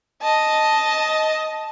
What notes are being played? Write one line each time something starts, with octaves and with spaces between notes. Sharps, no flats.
D#5 A5